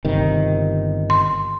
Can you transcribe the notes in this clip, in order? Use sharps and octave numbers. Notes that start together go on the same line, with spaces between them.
G1 C3 D#3
C6